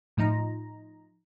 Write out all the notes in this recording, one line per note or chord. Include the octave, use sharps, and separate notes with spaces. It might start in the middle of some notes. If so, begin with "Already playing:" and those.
A2 F3 D#4 A#5